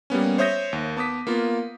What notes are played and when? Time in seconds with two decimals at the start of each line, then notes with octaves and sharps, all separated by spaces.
0.10 G3 A#3 B3 C#4
0.38 C5 C#5 E5 D#6 G6 A#6
0.73 D#2
0.97 B3 A5 D6 D#6 B6
1.27 A#3 B3 F4